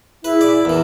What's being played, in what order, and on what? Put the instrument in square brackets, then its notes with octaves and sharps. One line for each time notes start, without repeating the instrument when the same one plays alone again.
[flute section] E4 G#4 E5 [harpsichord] B4
[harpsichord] D5
[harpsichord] E2 E3 [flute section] A#4